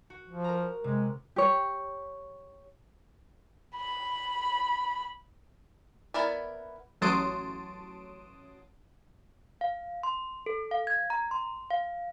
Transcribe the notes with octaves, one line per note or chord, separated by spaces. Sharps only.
F#4
F3
A#4 A#5
C3 G#3
G4 C#5
B5
B3 E4 A#4 D5
A1 F#3 A5 C6 D#6 D7
F5
C6
A4
F5
G#6
A#5
C6
F5